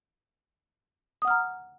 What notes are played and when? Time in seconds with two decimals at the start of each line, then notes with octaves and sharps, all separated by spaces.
1.22 D#6
1.25 F#5
1.27 F6
1.30 A#5